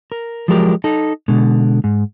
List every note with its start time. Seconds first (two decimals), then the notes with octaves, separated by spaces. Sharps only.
0.12 A#4
0.48 F3 F#3 G#3 G4 A#4
0.84 D#4 A4
1.28 B2 D3 G#3
1.84 G#2